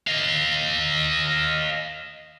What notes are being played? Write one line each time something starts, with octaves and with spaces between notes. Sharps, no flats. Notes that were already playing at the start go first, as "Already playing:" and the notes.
D#5 F5